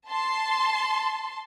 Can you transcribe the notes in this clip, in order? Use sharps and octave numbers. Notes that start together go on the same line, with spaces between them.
A5 C6